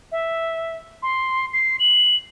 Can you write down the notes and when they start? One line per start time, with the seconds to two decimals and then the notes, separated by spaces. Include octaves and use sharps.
0.12 E5
1.03 C6
1.53 C7
1.80 F#7